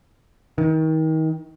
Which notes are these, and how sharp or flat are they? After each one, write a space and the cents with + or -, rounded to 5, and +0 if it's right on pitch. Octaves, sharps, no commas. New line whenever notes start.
D#3 +30